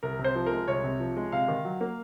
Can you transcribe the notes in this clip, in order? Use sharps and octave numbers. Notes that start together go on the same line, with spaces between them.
C2 A#4
C3
C5
F3
A#4
G#3
C2 C#5
C3
F3
G#3
C3 F5
D#3
F#3
A#3